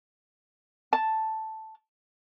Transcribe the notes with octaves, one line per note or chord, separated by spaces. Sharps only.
A5